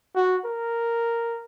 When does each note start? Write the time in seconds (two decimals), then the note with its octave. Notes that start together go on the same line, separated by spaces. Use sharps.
0.16 F#4
0.45 A#4